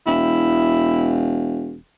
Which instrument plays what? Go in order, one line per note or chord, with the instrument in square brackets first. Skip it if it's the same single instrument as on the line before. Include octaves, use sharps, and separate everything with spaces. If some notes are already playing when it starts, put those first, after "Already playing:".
[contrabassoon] E1 [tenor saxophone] E4